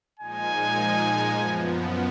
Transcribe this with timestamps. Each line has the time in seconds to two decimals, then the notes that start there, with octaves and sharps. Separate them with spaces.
0.19 A#2 F3 G#3 D#4 G#5
1.30 F#2 F3 B3